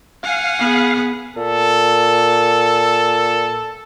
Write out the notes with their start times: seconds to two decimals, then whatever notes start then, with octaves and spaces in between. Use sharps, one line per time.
0.23 F5 F#5 G#5
0.59 B3 G#4
1.36 A#2 A4